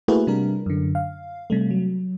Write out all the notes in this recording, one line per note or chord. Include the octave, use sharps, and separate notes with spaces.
A3 A#3 E4 F#4 G#4 B4
C3 G3 D4 A#4
F#2 D3
F5
C3 G3 A3
F#3